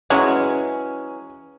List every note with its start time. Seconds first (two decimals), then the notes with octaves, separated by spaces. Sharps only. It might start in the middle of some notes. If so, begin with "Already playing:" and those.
0.10 E3 F#3 G#3 C#4